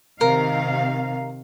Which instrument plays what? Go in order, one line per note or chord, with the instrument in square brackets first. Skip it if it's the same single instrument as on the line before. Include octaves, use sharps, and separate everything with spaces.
[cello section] C3 D#3 F5 [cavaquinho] A#4